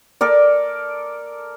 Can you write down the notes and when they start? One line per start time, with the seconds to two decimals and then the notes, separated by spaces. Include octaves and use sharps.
0.21 A4 A#4 D5